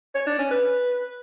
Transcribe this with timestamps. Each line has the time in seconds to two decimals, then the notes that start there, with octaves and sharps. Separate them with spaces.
0.15 C#5
0.27 D4
0.39 C#4
0.51 B4